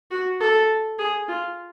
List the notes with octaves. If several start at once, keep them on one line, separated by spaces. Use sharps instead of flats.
F#4
A4
G#4
F4